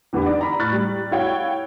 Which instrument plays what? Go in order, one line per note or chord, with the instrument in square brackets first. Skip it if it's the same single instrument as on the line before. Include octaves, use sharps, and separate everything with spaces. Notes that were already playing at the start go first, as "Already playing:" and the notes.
[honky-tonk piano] E2 D3 B3 G4 B5
D#4 D5
A#5 B5
A2 B5 C#6 F#6 A6
G3
E4 F#4 C#5 F5 G5